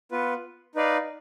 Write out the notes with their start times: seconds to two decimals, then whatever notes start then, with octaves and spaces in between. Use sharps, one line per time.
0.11 B3 F4 B4
0.75 D#4 B4 D5 F5